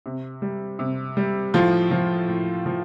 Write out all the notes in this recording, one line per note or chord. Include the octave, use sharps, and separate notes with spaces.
C3
G3
C3
G3
A2 F3 F4
F3
A2
F3